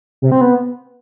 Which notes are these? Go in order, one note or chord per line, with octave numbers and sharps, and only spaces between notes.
C3
C4
B3